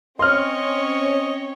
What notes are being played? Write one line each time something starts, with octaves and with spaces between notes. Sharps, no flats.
C4 C#4 C#5 D#5 C6 F6